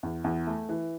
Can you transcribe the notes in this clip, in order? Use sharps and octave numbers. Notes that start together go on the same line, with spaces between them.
E2
E2
A3
E3